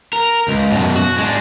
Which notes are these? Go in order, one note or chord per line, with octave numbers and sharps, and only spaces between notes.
A#4
C#2
F#2 B2
F#4
G#3 D4